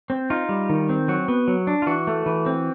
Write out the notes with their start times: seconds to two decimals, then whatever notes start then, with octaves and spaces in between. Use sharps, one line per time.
0.10 C4
0.30 D#4 F4
0.49 G3
0.69 D#3
0.89 C4
1.08 F#3 F#4
1.28 B3
1.48 F#3
1.67 D4
1.82 F4
1.87 E3 F#4
2.07 A3
2.26 E3
2.46 C4